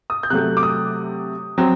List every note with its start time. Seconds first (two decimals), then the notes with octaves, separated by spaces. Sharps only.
0.10 D#6
0.23 G6
0.30 C3 F#3 A3 F#6
0.57 D6
0.63 D#6
1.58 F#3 C4